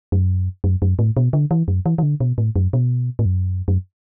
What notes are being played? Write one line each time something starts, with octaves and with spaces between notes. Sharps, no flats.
F#2
F#2
F#2
A2
B2
D3
E3
F#2
E3
E3
D3
B2
A2
F#2
B2
A2
F#2
F#2